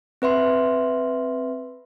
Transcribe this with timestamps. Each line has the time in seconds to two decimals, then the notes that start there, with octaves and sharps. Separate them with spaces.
0.22 C4 B4 E5 C6